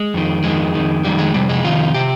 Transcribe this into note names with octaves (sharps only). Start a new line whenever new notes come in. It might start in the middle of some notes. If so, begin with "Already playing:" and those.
Already playing: G#3
F2 D#3
F2 D#3 G#3
F2 D#3
F2 D#3 G3
G#3
F2 C3 G3
G#3
F2 C3 D#3 F4
C3 G4